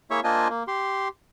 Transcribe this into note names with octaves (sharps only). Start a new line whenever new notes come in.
A#3 E4 G#4 C#5 E5 C#6
A#3 D4 F4 C5 D#5 G#5
A#3
G4 C6